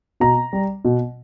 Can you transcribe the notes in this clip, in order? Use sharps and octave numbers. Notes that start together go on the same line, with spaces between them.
B2 A#5
G3
B2